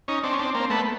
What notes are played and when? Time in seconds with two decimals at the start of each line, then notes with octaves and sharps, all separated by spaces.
0.08 C#4 D#4
0.23 C4 D4
0.33 C#4
0.39 C4 D4
0.54 A#3 C4
0.70 A3 B3